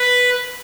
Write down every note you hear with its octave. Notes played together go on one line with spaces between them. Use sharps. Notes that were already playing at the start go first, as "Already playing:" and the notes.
Already playing: B4